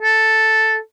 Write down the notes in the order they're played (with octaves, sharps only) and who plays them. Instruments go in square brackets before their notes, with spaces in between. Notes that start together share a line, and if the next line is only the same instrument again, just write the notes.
[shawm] A4